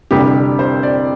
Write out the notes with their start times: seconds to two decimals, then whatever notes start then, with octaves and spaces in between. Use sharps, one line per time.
0.11 F1 F2 D3 G3 G4
0.59 C5
0.83 D5